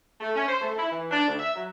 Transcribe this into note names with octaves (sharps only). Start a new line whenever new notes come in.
A3
C#4
C5
A3
E4
E3
D4
D2
E5
F#3